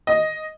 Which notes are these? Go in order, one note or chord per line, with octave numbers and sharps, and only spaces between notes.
D#5